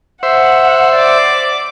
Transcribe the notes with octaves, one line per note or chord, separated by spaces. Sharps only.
C5 E5 F#5
D5 D6